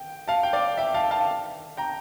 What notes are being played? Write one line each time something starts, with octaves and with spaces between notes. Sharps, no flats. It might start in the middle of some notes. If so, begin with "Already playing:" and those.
Already playing: G5
F5 A5
G5
D5 F5
E5 G5
F5 A5
F5 A5
G5 A#5